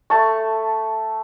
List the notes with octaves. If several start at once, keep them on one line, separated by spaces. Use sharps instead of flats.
A3 A5 C#6